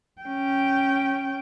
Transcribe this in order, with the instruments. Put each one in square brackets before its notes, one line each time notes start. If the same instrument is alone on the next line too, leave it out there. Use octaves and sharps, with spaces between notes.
[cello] C#4 G5